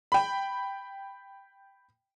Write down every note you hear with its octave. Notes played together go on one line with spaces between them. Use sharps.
G5 B5